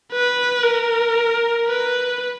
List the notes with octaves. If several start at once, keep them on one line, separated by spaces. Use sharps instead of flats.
B4
A#4
B4